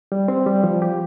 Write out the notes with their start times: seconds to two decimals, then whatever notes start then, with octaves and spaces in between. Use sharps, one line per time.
0.12 G3
0.28 C4
0.46 G3
0.64 F3
0.82 G4